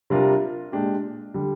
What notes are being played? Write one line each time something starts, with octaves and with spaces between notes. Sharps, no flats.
C3 G3 D4 F4 A#4
A#2 G#3 D4 G4
D3 G3